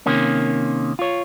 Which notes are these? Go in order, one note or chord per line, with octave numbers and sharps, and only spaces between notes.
C3 D#3 A#3 C#4
F4 C#5